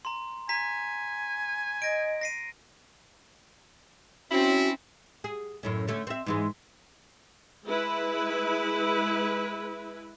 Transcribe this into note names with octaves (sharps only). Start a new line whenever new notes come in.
A#5 C6
G#5 A#5 B6
D#5 A#6 D7
A#6 C7 D#7
C4 C#4 E4 F#4
G#4
F#2 A2 C#4
D3 A3 C#4
C4 E5
G#2 E3 G#3
G#3 E4 B4